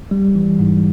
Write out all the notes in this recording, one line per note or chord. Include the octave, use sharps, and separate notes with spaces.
G3
E3
G#2